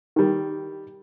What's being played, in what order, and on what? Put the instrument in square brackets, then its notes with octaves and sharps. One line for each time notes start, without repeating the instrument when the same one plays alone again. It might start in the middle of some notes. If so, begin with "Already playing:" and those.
[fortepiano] D#3 G3